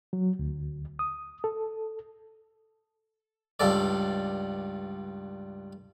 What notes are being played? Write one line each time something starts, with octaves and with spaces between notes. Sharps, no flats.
F#3
D2
D#6
A4
C#2 G2 A4 D5